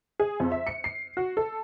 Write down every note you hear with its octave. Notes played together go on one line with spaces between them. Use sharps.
G#4
F2
E5
C#7
C7
F#4
A4